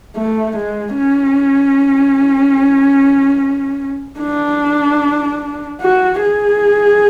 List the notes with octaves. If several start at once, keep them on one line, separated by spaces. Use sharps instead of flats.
A3
G#3
C#4
D4
F#4
G#4